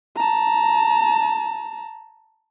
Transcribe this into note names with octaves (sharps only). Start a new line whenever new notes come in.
A5 A#5